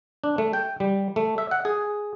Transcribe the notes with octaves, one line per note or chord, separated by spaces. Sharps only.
D4
A3
G5
G3
A3
E5
F#5
G#4